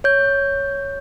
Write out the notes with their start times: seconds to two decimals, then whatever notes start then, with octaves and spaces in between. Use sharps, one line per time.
0.04 C#5 G6